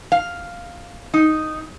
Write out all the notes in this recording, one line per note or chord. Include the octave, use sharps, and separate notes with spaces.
F5
D#4